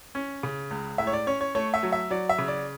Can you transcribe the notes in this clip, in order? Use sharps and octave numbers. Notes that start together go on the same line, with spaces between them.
C#4
C#3
C#2
A2 E5
C#5
D5
C#4 C#5
C#5
A3 C#5
E5
F#3
E5
F#3 D5
E5
C#3
D5